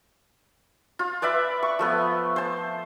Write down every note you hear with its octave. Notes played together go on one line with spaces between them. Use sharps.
F4
B4 D5 E5 B5
C#6
F3 A3 B3
C5 A5